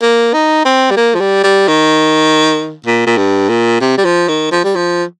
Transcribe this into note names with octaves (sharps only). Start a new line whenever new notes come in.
A#3
D#4
C4
G3
A#3
F3
G3
G3
D#3
A#2
A#2
G2
A#2
C3
G3
F3
D#3
F3
G3
F3